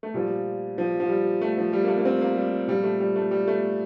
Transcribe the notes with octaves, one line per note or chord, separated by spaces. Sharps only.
A3
A#2 F3 G3
F3
F3
G3
A3
F3
G3
A#3
A3
A#3
C4
A#3
G3
A#2 F3 G3
A3
G3
A3
G3
A3